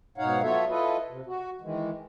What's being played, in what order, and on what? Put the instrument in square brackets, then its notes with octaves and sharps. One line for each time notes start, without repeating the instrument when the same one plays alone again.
[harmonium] G#2 B2 D#4 C#5 F5 F#5
F#3 B3 F4 A4 C#5 E5
E4 F4 A4 B4 D#5
C3
F#4
D#3 E3 G#3